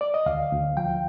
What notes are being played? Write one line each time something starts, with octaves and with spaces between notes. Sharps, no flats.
D5
D#5
D2 F5
D2
F3 G5